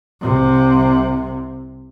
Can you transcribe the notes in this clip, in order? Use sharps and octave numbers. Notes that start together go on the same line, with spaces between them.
C2 C3